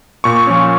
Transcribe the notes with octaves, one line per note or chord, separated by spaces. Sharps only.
A#2 C#6
F3 C#4